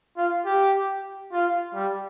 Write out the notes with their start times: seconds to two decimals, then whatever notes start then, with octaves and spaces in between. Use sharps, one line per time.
0.17 F4
0.46 G4
1.32 F4
1.74 G3